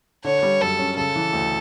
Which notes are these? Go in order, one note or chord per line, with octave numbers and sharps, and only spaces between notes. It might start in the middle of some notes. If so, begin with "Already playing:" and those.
D3 C#5
G3
F#2 A4
C#4
C#3 A4
E3
D2